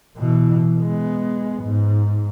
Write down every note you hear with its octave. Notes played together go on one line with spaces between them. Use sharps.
B2 E3
G#3 B3
G#2